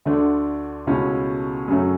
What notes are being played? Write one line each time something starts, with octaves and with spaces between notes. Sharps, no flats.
D2 D3 A3 D4
C#2 B2 A3 C#4 E4
F#2 C#3 F#3 A3